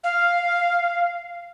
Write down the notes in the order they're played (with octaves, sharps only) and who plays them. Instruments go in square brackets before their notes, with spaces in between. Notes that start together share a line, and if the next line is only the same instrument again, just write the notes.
[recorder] F5